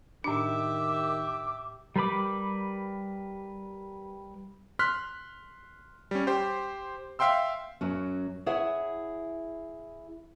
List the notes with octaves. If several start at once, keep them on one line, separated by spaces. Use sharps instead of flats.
A2 D#3 D4 G4 E5 D6
G3 A#4 B4 B5 D6
C6 F6 F#6 B6
G3 C#4
G4 C5
E5 F5 G5 C6 E6
F#2 F#3 C#4
E4 G#4 C#5 E5 F#5